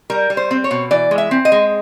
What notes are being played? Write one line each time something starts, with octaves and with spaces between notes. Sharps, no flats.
G3 A#4
G3
C5
C4
C#5
B2
E3 D5
G#3
E5
C4
D#5
G#3